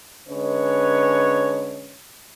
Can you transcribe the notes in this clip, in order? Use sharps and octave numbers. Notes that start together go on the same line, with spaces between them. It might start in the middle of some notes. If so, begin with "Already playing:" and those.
D3 G#3 C#4 B4 C#5